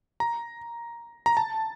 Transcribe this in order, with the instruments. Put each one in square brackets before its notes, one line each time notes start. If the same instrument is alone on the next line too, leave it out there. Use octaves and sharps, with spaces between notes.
[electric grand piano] A#5
A#5
A5